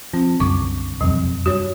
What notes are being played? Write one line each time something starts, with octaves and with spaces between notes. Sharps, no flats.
F3 C4
C2 F#2 D3 C#6 D6
E1 F2 C3 F#3
G2 F#4 C#5